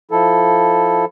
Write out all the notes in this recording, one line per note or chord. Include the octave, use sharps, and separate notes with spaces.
F3 E4 A4